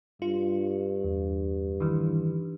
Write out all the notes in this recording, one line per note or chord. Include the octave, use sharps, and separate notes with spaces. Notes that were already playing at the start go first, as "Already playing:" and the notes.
G2 F4
E2
D#3 E3